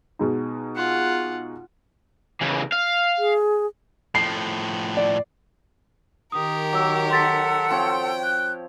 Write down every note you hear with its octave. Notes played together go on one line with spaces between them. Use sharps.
B2 G#3 D#4
F4 F#5
C#3 E3
F5
G#4
A2 F3 C7
D5
D#3 G4 A#4 D#6
F#3 D6 E6
A4 F#5 C6 E6 A6 B6
F3 C4 C#5 G5
F#6 G6